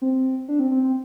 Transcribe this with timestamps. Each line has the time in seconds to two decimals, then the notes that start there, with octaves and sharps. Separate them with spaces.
0.02 C4
0.48 D4
0.60 C4
0.72 C4
0.84 C4